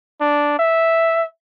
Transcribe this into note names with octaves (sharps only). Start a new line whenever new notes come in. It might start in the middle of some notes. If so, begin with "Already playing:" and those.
D4
E5